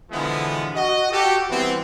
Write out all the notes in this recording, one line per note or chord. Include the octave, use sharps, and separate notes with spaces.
B2 D3 E3 F3 G#3 B3
F#4 D#5
F#4 G4 A4
E3 G3 B3 C4